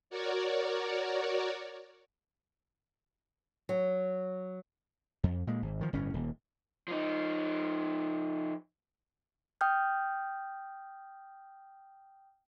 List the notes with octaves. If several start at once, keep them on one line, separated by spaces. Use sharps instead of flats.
F#4 A#4 C#5 D5
F#3
F2
A#2 G#3
G#1
D#3 F3
G1 A2 C#4
D#1
F3 D#4
G5 D#6 F6 G6